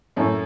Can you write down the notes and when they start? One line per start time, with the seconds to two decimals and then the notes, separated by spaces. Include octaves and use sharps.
0.16 F#2 A2